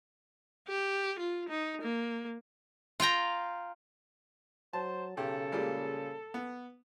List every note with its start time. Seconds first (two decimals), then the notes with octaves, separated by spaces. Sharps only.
0.68 G4
1.19 F4
1.49 D#4
1.82 A#3
3.00 F4 F5 G5 A#5
4.73 F#3 C5 A5
5.17 B1 C#3 G4 A4
5.52 A#2 G3 G#3
6.34 B3